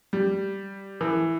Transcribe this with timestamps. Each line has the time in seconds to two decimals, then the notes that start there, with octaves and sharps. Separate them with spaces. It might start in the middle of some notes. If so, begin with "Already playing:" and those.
0.13 G3
1.01 E3